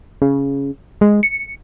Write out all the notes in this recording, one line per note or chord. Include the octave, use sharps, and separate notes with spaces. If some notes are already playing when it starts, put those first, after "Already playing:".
C#3
G#3
C#7